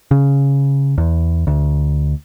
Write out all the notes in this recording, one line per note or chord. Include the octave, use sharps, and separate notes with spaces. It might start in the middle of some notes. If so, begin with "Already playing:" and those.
C#3
E2
D2